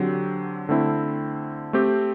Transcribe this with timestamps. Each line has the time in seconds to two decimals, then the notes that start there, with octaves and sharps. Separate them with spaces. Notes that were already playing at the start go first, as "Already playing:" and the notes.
Already playing: D3 F#3 C4 G4
0.69 D3 A3 C4 E4
1.73 A3 C4 G4